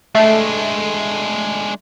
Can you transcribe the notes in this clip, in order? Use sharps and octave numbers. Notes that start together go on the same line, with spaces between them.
G#3 A3 D4